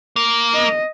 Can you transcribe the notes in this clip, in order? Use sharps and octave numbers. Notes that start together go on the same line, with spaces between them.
A#3
D#5